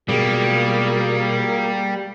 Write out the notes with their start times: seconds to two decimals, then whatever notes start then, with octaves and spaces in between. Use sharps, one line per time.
0.09 B2 G3 A#3 F4 F#4 G#4